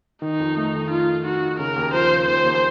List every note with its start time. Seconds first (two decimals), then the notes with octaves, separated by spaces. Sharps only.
0.22 D#3 D#4
0.40 F2
0.57 A3
0.73 D#3
0.90 D#4 F4
1.08 D#4
1.25 D#4 F#4
1.42 D#4
1.59 C#3 A#4
1.76 D#2
1.94 F3 C5
2.10 C#3
2.27 D#2 C5
2.44 D#2